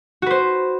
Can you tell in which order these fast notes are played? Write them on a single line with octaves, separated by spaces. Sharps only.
F#4 B4 C5